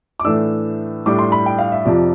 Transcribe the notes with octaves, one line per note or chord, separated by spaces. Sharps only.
D6
A2 E3 A3 D4 E6
A2 G3 D4 D6
C6
B5
G5
F5
E5
F2 C3 F3 D5